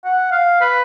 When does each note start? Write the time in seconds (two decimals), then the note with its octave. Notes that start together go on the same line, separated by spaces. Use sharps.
0.04 F#5
0.31 F5
0.61 B4